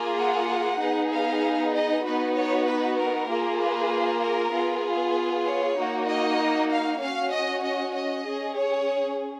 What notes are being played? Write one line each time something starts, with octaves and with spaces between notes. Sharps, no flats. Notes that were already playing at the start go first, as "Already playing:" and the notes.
Already playing: A#3 F4 G#4
F#5
B3 D#4 G#4
F5
D#5
B3 D#4 F#4 B4
C#5
B4
A#4
A#3 F4 G#4
B4
A#4
B3 F4 G#4
C#5
A#3 D#4 F#4
D#5
F5
C#4 F#4 F5
D#5
D#5
D#5
C#4 G#4
C#5